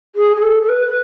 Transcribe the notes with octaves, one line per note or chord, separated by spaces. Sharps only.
G#4
G#4
A4
A4
B4
B4